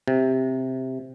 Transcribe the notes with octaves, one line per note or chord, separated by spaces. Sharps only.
C3